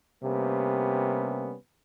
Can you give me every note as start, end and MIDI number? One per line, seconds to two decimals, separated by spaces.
0.24 1.54 48
0.24 1.54 55
0.24 1.54 58
0.24 1.54 59
0.24 1.54 61